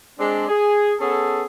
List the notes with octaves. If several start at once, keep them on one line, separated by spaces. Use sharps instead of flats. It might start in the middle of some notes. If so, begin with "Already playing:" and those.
G#3 C4 D4
G#4
B3 C#4 G#4 A4